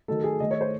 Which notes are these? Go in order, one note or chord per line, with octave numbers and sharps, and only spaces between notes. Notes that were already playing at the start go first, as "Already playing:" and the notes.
D#3 F#3 A3 A4
G#4
D#3 A3 D#5
C#5
C5